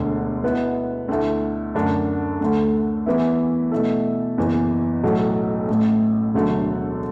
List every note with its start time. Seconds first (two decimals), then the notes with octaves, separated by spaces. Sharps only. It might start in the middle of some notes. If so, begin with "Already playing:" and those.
Already playing: E1 D2 D3
0.43 B2 B3 E4
1.08 D2 D3 A3 E4
1.75 F#2 D3 A3 D4
2.41 D2 D3 A3
3.06 E2 E3 B3 E4
3.71 B2 A3 E4 A4
4.38 F#1 E2 E3
5.03 B1 A2 F#3 A3
5.68 A1 A2 A3
6.34 E1 D2 D3 F#3 A3